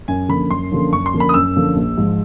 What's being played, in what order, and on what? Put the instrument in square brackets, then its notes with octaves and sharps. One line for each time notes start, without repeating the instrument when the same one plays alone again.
[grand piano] F#2 [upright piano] G#5
[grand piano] D3 F3 A#3 C#4 [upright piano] B5
[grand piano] F#2 [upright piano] C6
[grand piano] D3 F3 A#3 C#4
[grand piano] F#2 [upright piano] C#6
[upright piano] C6
[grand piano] D3 F3 A#3 C#4
[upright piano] B5
D#6
[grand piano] F#2 [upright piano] E6
[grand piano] D3 F3 A#3 C#4
A#1
G#2 F3